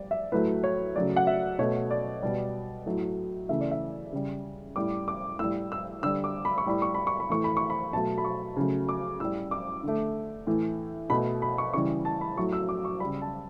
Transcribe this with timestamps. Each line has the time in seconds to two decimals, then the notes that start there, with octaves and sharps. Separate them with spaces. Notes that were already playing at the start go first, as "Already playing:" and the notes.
Already playing: G3 D5
0.11 E5
0.32 A2 F#3 A3 B4
0.64 C#5
0.95 C#3 F#3 A3 D5
1.16 F#5
1.27 E5
1.59 B2 A3 C#5
1.91 D5
2.22 B2 G3
2.86 A2 F#3 A3
3.49 C#3 E3 A3 E5
3.61 D5
3.71 E5
4.12 C#3 G3
4.76 A2 G3 D6
5.08 D6
5.39 A2 G3 E6
5.72 E6
6.03 D3 G3 E6
6.24 D6
6.45 B5
6.58 C#6
6.66 A2 G3 B5
6.82 C#6
6.94 B5
7.07 C#6
7.20 B5
7.30 A2 E3 A3 C#6
7.44 B5
7.57 C#6
7.70 B5
7.93 B2 F#3 A3 A5
8.18 B5
8.25 C#6
8.57 C#3 F#3 A3
8.89 D6
9.20 A2 G3 E6
9.51 D6
9.83 D3 A3
10.47 A2 E3 A3
11.10 B2 A3 B5
11.42 B5
11.58 C#6
11.73 C#3 E3 G3 C#6
12.05 A5
12.21 B5
12.37 A2 F#3 A3 C#6
12.53 E6
12.69 D6
12.85 C#6
13.00 C#3 G3 B5
13.22 A5